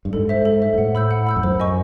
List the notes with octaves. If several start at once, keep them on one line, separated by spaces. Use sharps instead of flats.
G2
G#2 A4
C5 E5
A4
C5 E5
G#2
A2 F#5
B5 E6 G6
F#5
B5 E6 G6
F2
F#2 C5
D#5 G#5 C#6